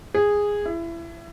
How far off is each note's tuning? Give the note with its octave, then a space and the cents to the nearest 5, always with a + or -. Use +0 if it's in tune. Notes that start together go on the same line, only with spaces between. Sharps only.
G#4 -10
E4 +25